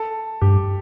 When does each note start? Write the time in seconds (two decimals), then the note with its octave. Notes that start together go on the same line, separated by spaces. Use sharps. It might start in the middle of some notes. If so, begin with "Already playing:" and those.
Already playing: A4
0.42 G2 G4